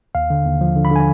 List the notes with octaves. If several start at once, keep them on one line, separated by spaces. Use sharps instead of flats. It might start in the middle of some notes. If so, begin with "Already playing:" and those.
D#2 F5
D3
D#2
F3
D3
B5
D3 G#5